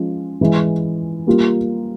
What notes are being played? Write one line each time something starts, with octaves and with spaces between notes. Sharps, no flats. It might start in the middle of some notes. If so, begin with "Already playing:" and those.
Already playing: F3 G#3 C#4
E3 G#3 E4
G3 A#3 F4